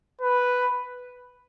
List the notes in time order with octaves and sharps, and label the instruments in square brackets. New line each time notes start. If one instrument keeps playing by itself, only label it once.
[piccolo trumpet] B4